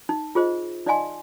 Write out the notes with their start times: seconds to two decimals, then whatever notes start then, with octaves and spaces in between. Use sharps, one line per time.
0.09 D#4
0.35 F4 G#4 C5 D#5
0.86 D#4 D5 D#5 F5 G#5 C6